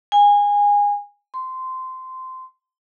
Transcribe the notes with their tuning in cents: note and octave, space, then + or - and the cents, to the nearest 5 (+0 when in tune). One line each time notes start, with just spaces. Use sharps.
G#5 -20
C6 -15